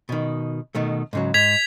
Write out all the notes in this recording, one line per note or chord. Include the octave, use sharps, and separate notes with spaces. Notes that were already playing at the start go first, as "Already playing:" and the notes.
B2 D#3
B2 D#3 A3
G#2 C#3 F#3
G#2 G#6 B6 F7